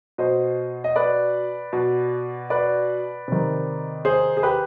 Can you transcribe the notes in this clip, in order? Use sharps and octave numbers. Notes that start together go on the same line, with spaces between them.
B2 C5 D#5
D#5
B4 D5
B2
B4 D5
C3 D#3
G#4 C5
G#4
G4 B4